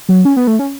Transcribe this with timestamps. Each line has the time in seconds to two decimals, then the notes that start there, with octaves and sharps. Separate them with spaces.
0.09 F#3
0.25 C#4
0.37 B3
0.47 A3
0.59 C#4